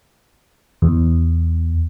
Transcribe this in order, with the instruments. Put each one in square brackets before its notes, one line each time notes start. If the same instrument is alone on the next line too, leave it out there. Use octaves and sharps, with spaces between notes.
[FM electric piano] E2